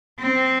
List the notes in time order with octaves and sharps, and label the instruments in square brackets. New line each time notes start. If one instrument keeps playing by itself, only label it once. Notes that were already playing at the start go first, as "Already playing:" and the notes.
[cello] C4